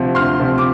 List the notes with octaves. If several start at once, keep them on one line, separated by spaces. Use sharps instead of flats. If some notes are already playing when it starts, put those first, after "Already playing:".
Already playing: D2 C3 F3
D2 C6 F6
C3 F3
D6